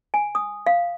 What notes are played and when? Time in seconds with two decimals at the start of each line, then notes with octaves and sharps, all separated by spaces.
0.14 G#5
0.35 D#6
0.66 F5